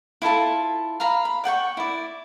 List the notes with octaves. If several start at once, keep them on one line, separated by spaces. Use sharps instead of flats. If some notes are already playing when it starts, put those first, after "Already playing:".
E4 F4 A4 A5
F5 A#5 B5
B5
D5 F#5 G5 C#6
E4 D5